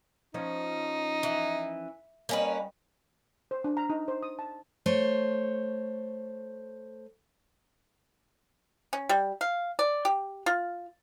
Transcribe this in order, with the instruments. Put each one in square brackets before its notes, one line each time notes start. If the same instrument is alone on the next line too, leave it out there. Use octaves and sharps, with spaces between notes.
[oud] F3 C#4 [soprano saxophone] D#4
[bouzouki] E3
[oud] G3 D#5 [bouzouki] A#3 C#4 B4
[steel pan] C5
D4
A#5
D#4
C5
D#6
A5
[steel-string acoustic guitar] A3 C5 C#5
[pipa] C#4
G3
F5
D5
G4
F4